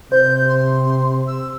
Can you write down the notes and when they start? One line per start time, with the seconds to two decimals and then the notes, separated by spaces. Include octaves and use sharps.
0.12 C3 C5 G6
0.49 C6
1.28 E6